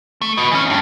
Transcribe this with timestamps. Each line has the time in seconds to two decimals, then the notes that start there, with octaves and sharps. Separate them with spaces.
0.22 A3
0.37 B4 D#5
0.51 E3 C#4
0.65 E2 G2